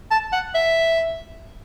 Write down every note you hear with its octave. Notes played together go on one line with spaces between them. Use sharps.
A5
F#5
E5